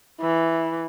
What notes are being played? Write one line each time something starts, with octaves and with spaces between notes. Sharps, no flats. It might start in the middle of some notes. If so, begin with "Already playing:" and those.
E3